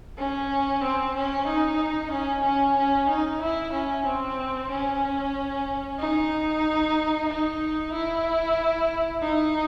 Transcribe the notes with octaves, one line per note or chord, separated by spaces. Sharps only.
C#4
C4
C#4
D#4
C#4
C#4
C#4
D#4
E4
C#4
C4
C#4
D#4
D#4
E4
D#4